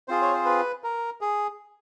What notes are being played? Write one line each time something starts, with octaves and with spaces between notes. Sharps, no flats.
C4 F4 G#4 C5
C#5
C5
B4
A#4
G#4